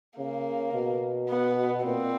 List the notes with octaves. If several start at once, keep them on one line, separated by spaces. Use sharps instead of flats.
C#3 A#3
B2
B3
A#2 C4